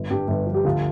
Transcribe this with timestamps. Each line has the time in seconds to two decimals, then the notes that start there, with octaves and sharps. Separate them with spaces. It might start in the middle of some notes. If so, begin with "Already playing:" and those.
Already playing: G1
0.10 G2 G4
0.28 G1
0.46 F3
0.54 G4
0.65 D2 F4